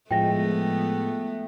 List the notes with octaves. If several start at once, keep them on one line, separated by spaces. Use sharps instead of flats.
A2 F3 G#3 A3 B3 G5 A#6